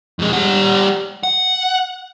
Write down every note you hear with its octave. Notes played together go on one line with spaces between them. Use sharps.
F2 G#3
G3 F#5
F#5